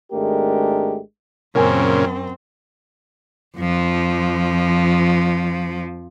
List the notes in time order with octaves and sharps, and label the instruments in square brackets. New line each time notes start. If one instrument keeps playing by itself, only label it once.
[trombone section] G#1 G#3 A3 D4 G4 A#4
[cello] F#2 C4 [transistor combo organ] A#2 C#3 [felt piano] A#4 G#5
[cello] F2 F3